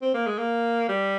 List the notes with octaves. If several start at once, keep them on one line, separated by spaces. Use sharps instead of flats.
C4
A#3
G#3
A#3
G3